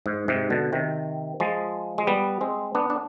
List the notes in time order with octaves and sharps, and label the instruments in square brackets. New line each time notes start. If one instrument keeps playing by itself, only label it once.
[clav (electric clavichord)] G#2
G#2 C3
B2 D3
C3 D#3
F3 G#3
G#3
G3 B3
G#3 C4
B3 D4
D4